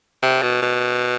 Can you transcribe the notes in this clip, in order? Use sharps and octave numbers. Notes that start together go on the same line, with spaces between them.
C3
B2
B2